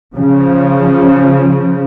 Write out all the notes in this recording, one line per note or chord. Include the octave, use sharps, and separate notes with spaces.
C#3 F3